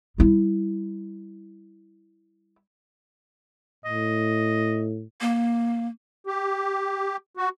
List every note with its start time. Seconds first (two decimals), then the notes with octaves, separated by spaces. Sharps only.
0.18 G3 E4
3.85 A2 D#5
5.21 A#3
6.27 G4
7.37 F#4